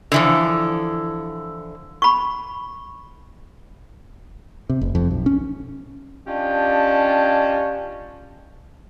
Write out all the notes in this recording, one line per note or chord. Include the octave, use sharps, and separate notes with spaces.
D3 E3 F3
B5 C#6
C3
F1
F2
B1
C#4
C#4 D4 F4 G4 D#5 A5